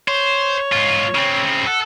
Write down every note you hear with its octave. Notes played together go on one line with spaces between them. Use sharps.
C5 C#5
G#2 F4
C#3 C4
A4 F#5